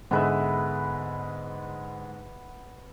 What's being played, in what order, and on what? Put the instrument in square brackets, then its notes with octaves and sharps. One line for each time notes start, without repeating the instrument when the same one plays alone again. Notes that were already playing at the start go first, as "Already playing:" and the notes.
[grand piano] G#2 D3 G#3 [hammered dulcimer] B3 B4 E5